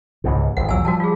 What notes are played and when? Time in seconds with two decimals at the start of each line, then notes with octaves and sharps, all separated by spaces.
0.24 C#2 G#2 C3
0.57 G#1 F2 F#5
0.69 A#1 E2 F#3 G#5 E6
0.85 F3 G3 F#4 A#4 A5
1.00 F4 G#4